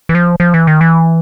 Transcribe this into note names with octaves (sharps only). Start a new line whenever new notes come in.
E3
F3
F3
E3
D#3
E3